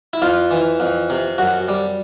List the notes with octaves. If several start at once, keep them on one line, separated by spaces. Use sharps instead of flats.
E4
F2 F4
E3
F2
C3
F#2 F#4
G3